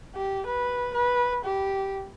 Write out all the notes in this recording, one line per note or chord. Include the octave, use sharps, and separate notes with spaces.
G4
B4
B4
G4